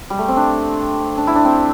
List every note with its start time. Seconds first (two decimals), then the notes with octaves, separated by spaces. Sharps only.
0.10 G3
0.18 A3
0.28 C4
0.37 D4
1.18 D4
1.27 E4
1.36 D4
1.45 C4